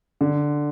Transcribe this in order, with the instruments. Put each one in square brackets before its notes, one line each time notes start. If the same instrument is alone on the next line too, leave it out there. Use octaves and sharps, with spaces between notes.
[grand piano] D3